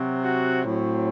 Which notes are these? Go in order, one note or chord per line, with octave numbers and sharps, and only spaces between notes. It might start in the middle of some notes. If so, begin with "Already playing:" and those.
Already playing: C3 F#3 C4
F#4
A2 F#3 C4